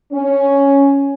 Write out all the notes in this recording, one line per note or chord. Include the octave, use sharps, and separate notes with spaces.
C#4